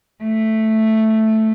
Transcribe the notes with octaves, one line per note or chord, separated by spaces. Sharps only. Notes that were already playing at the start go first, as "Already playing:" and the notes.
A3